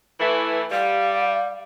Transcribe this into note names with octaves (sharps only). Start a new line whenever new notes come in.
E3 A3
G3 F5